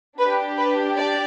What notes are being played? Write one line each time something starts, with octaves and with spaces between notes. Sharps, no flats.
D4 G4 B4
B4
D5